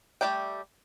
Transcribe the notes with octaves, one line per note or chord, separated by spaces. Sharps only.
G3 A3 G4 D5 G5